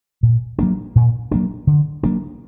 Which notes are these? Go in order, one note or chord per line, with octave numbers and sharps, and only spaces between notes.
A#2
F#3 A#3 D4
A#2
F#3 A#3 D4
D3
F#3 A#3 D4